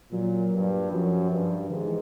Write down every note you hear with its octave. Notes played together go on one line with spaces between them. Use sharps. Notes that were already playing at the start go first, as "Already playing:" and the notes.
A#2 F#3
G2
F#2 F3
G2
G#2 D#3
E3